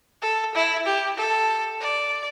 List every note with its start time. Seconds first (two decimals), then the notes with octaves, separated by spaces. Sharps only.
0.22 A4
0.55 E4
0.86 G4
1.17 A4
1.81 D5